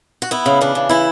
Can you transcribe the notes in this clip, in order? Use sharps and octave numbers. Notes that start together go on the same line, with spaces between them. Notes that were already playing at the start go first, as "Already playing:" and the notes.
F#4
B3 E4
C#3
E3 D4
C#3
E3 E4